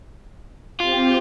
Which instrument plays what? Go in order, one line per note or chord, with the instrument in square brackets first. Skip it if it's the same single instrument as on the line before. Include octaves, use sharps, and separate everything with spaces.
[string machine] C4 G4 [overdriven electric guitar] F4